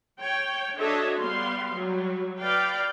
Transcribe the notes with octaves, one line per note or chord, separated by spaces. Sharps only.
C#5 G5
D4 F#4 A4 C#5 D#5 E5
G3 B3 F5 C6
F#3 G3
B4 D5 F5 G5